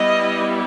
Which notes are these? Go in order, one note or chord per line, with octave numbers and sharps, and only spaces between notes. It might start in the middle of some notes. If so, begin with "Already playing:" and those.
Already playing: G3 B3 E4 D#5